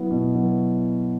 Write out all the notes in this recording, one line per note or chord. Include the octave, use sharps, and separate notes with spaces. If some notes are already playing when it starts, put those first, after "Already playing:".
Already playing: F#3 B3 E4
B2
F#3 B3 E4